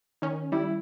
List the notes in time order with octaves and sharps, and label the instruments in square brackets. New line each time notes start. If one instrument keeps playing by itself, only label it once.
[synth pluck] D#3 C#4
[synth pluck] G3 [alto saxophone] E4